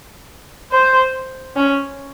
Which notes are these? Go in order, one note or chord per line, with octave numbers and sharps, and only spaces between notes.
C5
C#4